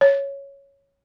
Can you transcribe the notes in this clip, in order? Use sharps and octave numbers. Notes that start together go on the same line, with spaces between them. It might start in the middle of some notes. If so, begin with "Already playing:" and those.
C#5